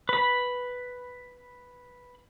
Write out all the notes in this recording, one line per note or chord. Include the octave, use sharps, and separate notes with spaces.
B4 B5